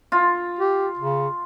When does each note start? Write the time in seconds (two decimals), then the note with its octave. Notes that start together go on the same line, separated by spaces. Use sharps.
0.12 F4
0.59 G4
0.99 C#3